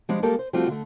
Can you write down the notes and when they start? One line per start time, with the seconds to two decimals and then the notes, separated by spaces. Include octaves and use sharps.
0.09 F3 G3 G#3 D4
0.22 G3 G#3 A#3 G4 A4
0.39 C5
0.53 F3 G3 A3 C4 F4 F#4
0.67 D3 A3